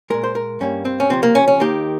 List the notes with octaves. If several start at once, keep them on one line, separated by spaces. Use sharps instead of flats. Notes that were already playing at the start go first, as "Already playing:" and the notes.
A#2 G#3 A#4
C5
A#4
G2 G3 A#3 C#4
C4
C#4
C#2 C3 F3 C4
A#3
C#4
C#4
D#2 D#3 A#3 G4